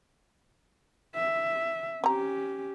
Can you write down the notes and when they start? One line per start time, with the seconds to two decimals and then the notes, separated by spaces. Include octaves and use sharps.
1.15 E5
2.04 C4 C#4 G4 A#5